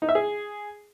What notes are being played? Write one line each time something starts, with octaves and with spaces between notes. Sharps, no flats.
D#4
E5
G#4